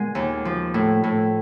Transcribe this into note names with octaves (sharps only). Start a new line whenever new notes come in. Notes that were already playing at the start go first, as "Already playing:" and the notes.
Already playing: A#2 G#3 B3 F#5 G#5
D#2
F3
A2
A2